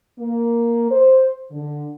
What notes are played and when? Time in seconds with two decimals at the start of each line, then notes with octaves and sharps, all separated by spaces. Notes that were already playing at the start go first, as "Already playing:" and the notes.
0.18 A#3
0.90 C5
1.52 D3